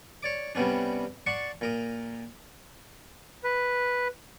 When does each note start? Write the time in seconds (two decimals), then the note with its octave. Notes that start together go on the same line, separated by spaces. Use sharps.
0.23 C#5 D5 D6
0.55 C3 G3 B3 C#4 D4
1.26 D5 F#5 A5 C6 C#6
1.61 A#2 A#4 D#6
3.44 B4